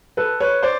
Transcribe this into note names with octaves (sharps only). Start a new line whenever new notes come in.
A4 B4
B4 C#5
C5 D5